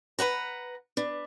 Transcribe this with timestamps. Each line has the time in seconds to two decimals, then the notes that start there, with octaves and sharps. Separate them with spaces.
0.19 B4 C5 F#5 A#5
0.97 D4 B4